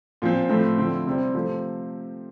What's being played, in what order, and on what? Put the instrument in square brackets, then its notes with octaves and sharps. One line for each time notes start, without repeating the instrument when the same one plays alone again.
[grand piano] A#2 F3 C4
A2 F3 A3 C4
D3 F3 C4 E4
C3 G3 C4 E4
C3 F3 A3 C4